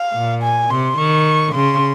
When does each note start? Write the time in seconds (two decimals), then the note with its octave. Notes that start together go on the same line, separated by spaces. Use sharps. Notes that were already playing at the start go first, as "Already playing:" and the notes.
Already playing: F5
0.13 A#2
0.42 G#5
0.70 C3 C6
0.98 D#3 C#6
1.54 C#3 C6